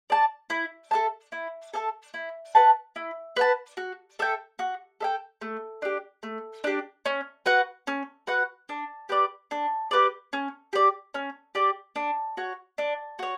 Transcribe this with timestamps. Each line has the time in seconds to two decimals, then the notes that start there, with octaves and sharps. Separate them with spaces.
0.10 D5 A5
0.50 E4
0.91 A4 E5 A5
1.32 E4
1.74 A4 E5 A5
2.14 E4
2.55 B4 F#5 A5
2.96 E4
3.36 B4 F#5 A5
3.77 F#4
4.19 A4 E5 G5
4.59 F#4
5.00 A4 E5 G5
5.41 A3
5.82 D4 G4
6.23 A3
6.64 D4 G4
7.06 C#4
7.46 F#4 B4 F#5
7.87 C#4
8.27 F#4 B4 F#5
8.69 D4
9.09 G4 B4 D5
9.51 D4
9.91 G4 B4 D5
10.33 C#4
10.73 G4 D5
11.14 C#4
11.55 G4 D5
11.96 D4
12.37 F#4 C#5
12.78 D4
13.19 F#4 C#5